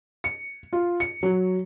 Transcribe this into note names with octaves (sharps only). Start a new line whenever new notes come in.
C#7
F4
C#7
F#3